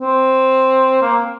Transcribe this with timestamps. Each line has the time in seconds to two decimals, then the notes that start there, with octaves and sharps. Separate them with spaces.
0.01 C4
1.02 A#3